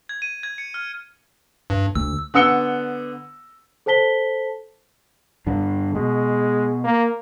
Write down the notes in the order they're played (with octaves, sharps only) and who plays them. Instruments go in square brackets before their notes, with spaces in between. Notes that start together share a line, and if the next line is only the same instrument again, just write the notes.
[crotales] G#6
D#7
G#6
C#7
F6
[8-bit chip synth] G2
[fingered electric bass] D2 [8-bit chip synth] E6
[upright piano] D3 B3 E6 C#7 G7
[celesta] A4 C5 A5 B6 G7
[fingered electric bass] G2 D3
[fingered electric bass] B2 [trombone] G#3
[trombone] A#3